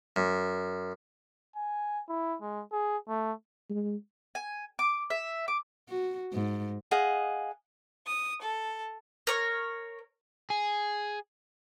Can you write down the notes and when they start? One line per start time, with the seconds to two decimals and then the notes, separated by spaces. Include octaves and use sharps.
0.16 F#2
1.56 G#5
2.09 E4
2.42 G#3
2.72 G#4
3.09 A3
3.70 G#3
4.35 G#5
4.79 D6
5.10 E5
5.48 D6
5.89 F#4
6.33 G#2
6.91 G#4 D#5 F5 F#5
8.08 D#6
8.42 A4
9.27 A#4 C#5
10.50 G#4